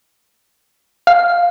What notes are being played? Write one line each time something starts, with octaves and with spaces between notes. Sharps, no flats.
F5